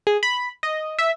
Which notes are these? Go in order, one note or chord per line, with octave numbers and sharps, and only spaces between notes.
G#4
B5
D#5
E5